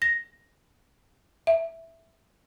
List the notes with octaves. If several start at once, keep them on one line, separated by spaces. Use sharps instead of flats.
A#6
E5